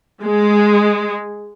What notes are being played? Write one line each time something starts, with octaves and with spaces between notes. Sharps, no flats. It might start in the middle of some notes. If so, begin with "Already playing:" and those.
G#3